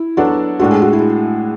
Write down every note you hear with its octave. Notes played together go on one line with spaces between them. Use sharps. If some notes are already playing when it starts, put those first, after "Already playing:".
Already playing: E4
F#3 B3 D4 F#4 A4 D5
A2 G#3 D4 F#4 A4
G#4
F#4
E4